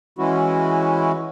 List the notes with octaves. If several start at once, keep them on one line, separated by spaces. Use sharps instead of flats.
E3 G#3 C#4 E4 F#4